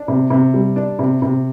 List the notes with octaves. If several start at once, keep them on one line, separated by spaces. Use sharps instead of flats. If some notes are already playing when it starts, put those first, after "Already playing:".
Already playing: D4
C3
C3
G3
D4
C3
C3